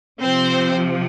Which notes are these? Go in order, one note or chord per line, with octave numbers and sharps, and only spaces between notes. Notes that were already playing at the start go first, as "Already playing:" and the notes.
C3 F3 C4 C5